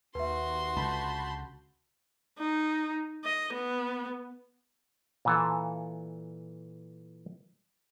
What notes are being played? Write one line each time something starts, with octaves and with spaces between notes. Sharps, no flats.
D#2 F#4 B4 E5 C6
C#2 D3 A5 B5 G6
D#4
D#5
B3
A#2 E3 A4